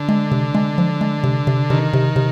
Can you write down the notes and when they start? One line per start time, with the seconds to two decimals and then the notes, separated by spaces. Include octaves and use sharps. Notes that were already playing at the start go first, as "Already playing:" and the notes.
Already playing: D3
0.09 G#3
0.32 C3
0.54 G#3
0.78 F3
1.01 G#3
1.24 C3
1.47 C3
1.70 C3 D#3
1.93 C3
2.16 C3